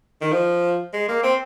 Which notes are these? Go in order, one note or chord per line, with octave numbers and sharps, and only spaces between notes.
D#3
F3
G#3
A#3
C4